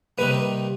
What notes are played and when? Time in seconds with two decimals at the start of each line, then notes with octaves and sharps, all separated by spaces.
0.18 C3 D#3 G3 A#3 B4